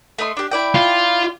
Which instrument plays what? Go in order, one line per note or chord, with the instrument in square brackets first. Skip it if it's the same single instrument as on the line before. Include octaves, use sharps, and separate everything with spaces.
[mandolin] A3 D#5 C6
D4 G4
E4 D5 G5
[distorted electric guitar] F4